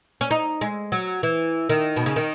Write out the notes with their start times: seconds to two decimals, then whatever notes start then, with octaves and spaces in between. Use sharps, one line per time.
0.21 C#4
0.31 D#4
0.61 G#3
0.92 F#3
1.23 E3
1.69 D#3
1.96 B2
2.06 C#3
2.16 D#3